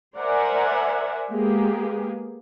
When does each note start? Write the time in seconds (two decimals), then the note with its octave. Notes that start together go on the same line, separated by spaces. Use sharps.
0.17 A#4 C5 D5 E5 F#5 G#5
1.31 G#3 A#3 B3 G4 G#4